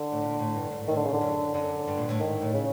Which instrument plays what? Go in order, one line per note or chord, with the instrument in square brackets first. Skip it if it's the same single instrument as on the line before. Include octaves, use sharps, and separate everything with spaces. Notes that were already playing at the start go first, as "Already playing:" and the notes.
Already playing: [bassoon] D3
[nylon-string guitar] A2
A#2
A2
G2
G#2
[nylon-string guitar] A2 [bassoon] D#3
[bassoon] D3
C#3
D3
[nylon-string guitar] F#2
[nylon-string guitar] F#2 [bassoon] D3
[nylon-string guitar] G2
A#2
A2
[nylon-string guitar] G#2 [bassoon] D#3
[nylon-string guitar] A2
[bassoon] C#3